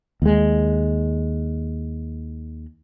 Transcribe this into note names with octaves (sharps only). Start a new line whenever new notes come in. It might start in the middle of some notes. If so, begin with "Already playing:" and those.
D#2 G#3